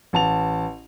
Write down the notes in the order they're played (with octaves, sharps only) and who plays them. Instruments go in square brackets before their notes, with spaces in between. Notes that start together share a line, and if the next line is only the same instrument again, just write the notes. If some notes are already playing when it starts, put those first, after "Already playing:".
[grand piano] A1 A5 F7